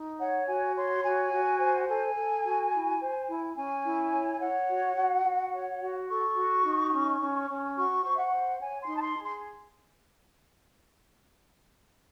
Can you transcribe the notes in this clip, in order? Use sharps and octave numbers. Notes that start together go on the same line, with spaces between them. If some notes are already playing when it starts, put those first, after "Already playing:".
Already playing: D#4
C#5 F#5
F#4 G#5
C#5 C6
F#4 G#5
F#4
C5
A4 G#5
A4
F#4
E4
C5
E4
C#4 G#5
E4
C#5
G#5
C#5 F#5
F#4
F#4
F#4
C#5
F#4
A4 C#6
F#4
D#4
C#4
C#4
C#4
F#4 C#6
C5
E5
F#5
C5
C#5 G#5
C6
D#4
A5
C6
G#4
C6